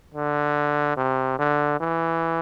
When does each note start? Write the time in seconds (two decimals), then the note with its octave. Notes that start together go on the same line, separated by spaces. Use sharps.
0.14 D3
0.97 C3
1.39 D3
1.80 E3